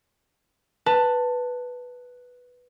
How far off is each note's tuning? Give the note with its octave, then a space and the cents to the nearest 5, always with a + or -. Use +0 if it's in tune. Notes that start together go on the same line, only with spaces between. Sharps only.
B4 +0 A5 +15